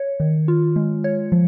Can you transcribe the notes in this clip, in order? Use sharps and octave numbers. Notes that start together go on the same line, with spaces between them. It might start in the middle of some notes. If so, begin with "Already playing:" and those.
Already playing: C#5
D#3
F4
G#3
C#5
F3